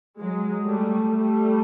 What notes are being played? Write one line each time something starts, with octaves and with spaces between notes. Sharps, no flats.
F#3 G#3
G3 A3
G3 A3